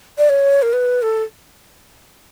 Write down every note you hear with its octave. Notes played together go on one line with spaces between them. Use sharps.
D5
C#5
A#4
B4
A4